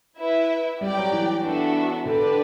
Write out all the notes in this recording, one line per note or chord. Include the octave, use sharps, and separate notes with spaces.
E4 B4 E5
G3 G4 D5 G5
F#3
E3
B3 D4 F#4 A4 E5
D3 D4 G4 B4 D5